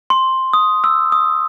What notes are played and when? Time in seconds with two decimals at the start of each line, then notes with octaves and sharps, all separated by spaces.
0.10 C6
0.53 D#6
0.84 E6
1.12 D#6